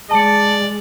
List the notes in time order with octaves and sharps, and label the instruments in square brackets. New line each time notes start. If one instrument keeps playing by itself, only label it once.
[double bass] G#3 [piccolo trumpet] D5 [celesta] A5 C#7